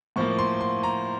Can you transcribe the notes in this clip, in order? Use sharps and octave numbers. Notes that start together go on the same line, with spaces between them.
A2 F3 A#3 C#6
C6
C6
A#5